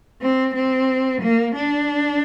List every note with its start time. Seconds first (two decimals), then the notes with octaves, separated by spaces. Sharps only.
0.22 C4
0.55 C4
1.22 A#3
1.56 D4